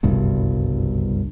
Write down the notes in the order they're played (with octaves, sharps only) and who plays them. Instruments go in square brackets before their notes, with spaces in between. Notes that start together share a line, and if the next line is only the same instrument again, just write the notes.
[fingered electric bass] F#1 C2 G2 B2